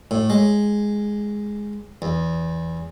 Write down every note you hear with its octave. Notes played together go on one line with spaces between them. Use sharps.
A2
G#3
E2